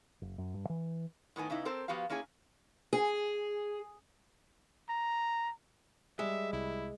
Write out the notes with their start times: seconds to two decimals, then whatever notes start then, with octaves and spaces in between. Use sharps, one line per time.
0.22 F#1
0.38 F#2
0.54 G2
0.69 E3
1.36 A2 D#3 B3 G#5
1.50 C#3 B3 D#4 E4
1.65 C4 A4 A#4 C5
1.88 F3 B3 F#4 G4 F5
2.10 A#3 C#4 E4 G#4 G#5
2.93 G#4
4.89 A#5
6.19 G3 G#3 E5
6.53 C2 E4